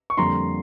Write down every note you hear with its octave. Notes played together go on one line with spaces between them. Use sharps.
C#6
F2 D3 G3 A#3 A#5 C6